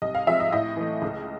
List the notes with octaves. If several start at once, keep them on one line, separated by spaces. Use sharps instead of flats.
C2 D#5
F5
C3 F3 G#3 E5
D#5
A2 D#5
E3 A3
C#2